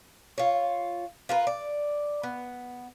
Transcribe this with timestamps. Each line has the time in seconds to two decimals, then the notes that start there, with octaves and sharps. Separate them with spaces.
0.38 F4 C#5
1.29 F4 A#4 B4
1.47 D5
2.23 B3